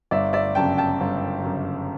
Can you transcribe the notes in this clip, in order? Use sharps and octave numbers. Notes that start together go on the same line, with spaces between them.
G1 D5 E5
D5 E5
F#2 C#3 G5 A5
G5 A5
G1
F#2 C#3